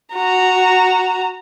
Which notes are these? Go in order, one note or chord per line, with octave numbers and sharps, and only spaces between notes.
F#4 A#5